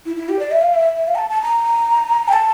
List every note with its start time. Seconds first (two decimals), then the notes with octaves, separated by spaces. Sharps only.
0.06 E4
0.16 E4
0.29 G4
0.39 D5
0.51 E5
0.62 F5
0.74 E5
0.97 E5
1.08 F5
1.15 A#5
1.18 A5
1.30 A5
1.42 A#5
2.28 G5
2.33 A5